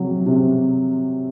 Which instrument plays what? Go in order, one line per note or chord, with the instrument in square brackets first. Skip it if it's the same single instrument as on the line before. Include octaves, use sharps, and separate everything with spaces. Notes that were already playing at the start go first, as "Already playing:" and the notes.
Already playing: [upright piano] C3 F#3
C3